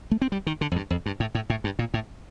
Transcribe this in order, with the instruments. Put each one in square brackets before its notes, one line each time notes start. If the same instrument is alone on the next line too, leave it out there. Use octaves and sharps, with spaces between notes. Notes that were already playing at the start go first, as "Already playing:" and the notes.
[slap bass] A3
C4
G3
D#3
D3
F2
G2
F2
G2
A2
A2
A2
G2
A#2
A2